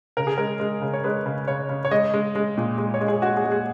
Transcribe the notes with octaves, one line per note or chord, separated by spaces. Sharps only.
C#3 A#4
G#4
G#3 A#4
G#3
C#3
C#5
G#3 B4
C#3
C#3 C#5
C#3
C#5
G#3 D#5
G#3
G#3
A#2
G#3
C#5
G#3
G#4
G#3 F#4
G#4
G#3
G#4